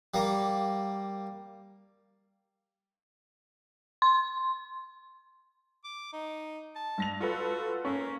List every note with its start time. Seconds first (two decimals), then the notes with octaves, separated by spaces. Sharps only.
0.14 G3 A#3
4.02 C6
5.84 D6
6.13 D#4
6.76 A5
6.98 G2 A#6 F7
7.20 F4 F#4 A4 B4
7.85 A#3 C#4